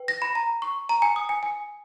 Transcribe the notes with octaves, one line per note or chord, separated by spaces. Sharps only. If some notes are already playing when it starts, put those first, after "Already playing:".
Already playing: B4 G5
A#6
B5
A#5
C#6
A#5
G#5
D#6
G#5
G#5